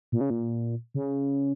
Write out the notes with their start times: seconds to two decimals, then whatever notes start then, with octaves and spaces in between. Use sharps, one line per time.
0.12 A#2
0.21 C#3
0.30 A#2
0.95 C#3